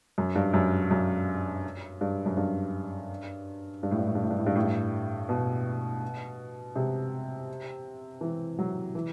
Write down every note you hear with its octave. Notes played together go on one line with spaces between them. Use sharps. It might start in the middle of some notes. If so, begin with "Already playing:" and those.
F#2
G2
F#2
F#2
G2
F#2
G2
G2
A2
G2
A2
G2
A2
G2
A2
G2
A2
G2
B2
C3
E3
F#3
E3